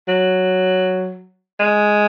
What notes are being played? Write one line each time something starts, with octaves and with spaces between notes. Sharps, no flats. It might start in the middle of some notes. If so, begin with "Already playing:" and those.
F#3
G#3